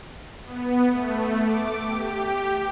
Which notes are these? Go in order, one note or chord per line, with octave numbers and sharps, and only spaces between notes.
B3
A3
D6
G4